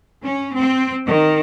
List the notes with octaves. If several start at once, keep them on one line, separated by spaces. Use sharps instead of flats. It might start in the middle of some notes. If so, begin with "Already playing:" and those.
C#4
C4
D#3